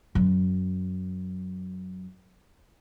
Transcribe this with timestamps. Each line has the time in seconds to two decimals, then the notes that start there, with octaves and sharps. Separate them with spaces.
0.15 F#2 F#3